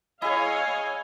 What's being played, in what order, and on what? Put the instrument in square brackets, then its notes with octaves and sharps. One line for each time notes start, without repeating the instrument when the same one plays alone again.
[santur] E4 G#4 [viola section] C#5 F5 [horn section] D#5 [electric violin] G#5